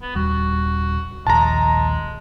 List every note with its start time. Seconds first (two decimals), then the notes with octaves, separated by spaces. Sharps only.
0.02 B3
0.15 D#1 G3 F#4
1.27 A#1 D#2 G#3 A5 A#5